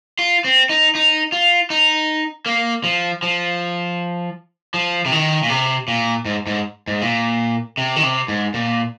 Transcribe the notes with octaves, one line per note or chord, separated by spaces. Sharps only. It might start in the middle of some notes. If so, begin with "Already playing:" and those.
F4
C4
D#4
D#4
F4
D#4
A#3
F3
F3
F3
C3
D#3
A#2
C3
A#2
G#2
G#2
G#2
A#2
C3
D#3
C3
G#2
A#2